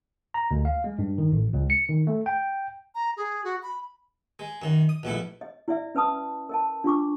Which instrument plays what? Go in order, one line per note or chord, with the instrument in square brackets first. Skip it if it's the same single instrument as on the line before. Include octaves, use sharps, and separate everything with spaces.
[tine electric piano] A#5
D2
F5
G#3
G2
D#3
A1
C#2
C#7
D#3
A3
G5
[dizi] A#5
G#4
F#4
B5
[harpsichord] G#3
F#2 D#3
D#6
A#1 B2 A3 E4
[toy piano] D#5
E4 D5 E5
C#4 B4 A5 D#6
A#4 D#5 A5
D4 F4 C#6 D6